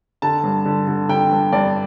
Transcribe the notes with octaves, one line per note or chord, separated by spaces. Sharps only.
D3 A5
G2
D3
D3
D3 G5
G2
G2 D5